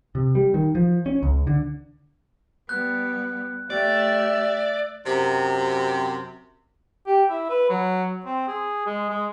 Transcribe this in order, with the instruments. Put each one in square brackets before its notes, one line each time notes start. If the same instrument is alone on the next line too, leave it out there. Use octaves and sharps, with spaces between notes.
[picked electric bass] C3
G3
D#3
F3
C#4
C#2
D3
[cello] G3 B3 [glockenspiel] F#6
[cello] A3 G4 [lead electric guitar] D5 [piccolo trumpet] E5
[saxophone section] F#2 C3
[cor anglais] G4
E4
B4
F#3
C4
G#4
G#3
G#3